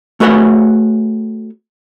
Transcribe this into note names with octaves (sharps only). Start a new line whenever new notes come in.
A3 F#4 G#4 B4 C#5 F#5